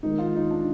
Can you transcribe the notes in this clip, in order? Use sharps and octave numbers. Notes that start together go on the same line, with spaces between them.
D#3 G#3 D#4
F4
D#4
D4